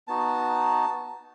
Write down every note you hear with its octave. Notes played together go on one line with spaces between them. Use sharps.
B3 D#4 F#4 A5